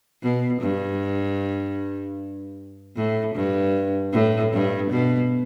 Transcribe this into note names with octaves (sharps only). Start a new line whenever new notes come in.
B2
G2
A2
G2
A2
G2
B2